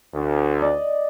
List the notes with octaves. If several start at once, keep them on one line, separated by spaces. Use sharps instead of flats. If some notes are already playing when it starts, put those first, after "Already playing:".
D2
D5 D#5